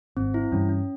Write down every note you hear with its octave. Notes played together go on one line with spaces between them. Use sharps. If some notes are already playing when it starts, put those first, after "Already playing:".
G#1 C4
E4
G2 E3 G3 C#4
C#4